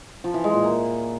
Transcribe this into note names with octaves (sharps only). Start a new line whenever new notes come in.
F3
E3
G#3
A#2
A#3